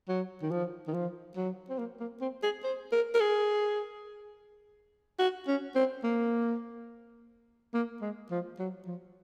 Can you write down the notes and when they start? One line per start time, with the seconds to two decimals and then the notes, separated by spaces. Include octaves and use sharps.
0.08 F#3
0.42 D#3
0.51 F3
0.87 D#3
0.94 F3
1.36 F#3
1.70 C4
1.79 A#3
2.00 A#3
2.21 C4
2.43 G#4
2.64 C5
2.92 A#4
3.14 A#4
3.20 G#4
5.19 F#4
5.47 C#4
5.75 C4
6.04 A#3
7.74 A#3
8.01 G#3
8.31 F3
8.59 F#3
8.87 F3